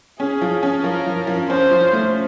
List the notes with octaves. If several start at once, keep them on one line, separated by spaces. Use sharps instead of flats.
C#4 G#4
F3
C#4
F3 A#4
F3
F3
C#4 C5
F3
A3